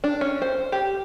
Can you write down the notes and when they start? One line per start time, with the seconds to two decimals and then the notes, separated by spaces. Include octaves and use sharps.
0.04 D4
0.21 C#4
0.42 C5
0.72 G4